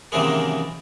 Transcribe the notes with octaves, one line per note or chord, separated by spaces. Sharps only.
F#2 C3 D#3 E3 G#3 A#3